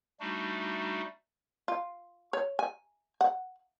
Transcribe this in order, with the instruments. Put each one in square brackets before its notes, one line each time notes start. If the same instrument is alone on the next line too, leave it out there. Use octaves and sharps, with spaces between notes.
[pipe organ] G3 A3 D4 D#4 F#4
[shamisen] F4
C#5
G#5
F#5